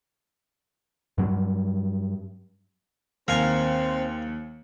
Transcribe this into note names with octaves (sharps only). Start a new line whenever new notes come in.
G2 F#3 G3
D#2 C4 A#4 F5 G#5